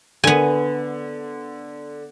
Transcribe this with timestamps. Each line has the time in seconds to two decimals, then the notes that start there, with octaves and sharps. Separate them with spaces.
0.24 D3 B3 G#5